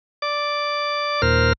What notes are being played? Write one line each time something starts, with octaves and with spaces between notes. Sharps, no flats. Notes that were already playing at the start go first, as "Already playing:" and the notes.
D5 D6
D#2 A#2 A#4 C5 F6